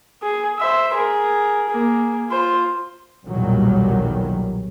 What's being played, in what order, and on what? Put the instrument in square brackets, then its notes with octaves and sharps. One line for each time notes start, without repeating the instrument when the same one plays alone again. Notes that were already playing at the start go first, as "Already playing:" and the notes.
[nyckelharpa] G#4
C5 E5
G#4 A#4
A#3 G#4
F4 C5
[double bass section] B1 E2 A#2 D#3 F#3 G3